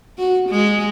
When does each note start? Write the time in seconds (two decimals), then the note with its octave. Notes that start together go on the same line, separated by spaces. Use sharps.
0.18 F#4
0.50 G#3